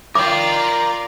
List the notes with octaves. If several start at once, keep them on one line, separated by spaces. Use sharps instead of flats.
F4 A#4 D5 G5 D6